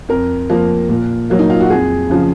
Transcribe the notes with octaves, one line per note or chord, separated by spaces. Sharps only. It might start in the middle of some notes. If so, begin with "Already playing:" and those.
F2 A#4
F3 A#3
A#2
F#3 A#3
D#4
F4
F#4
F2 G#4
C#3 F3